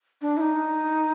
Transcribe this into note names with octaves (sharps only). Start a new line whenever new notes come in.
D4
E4
D#4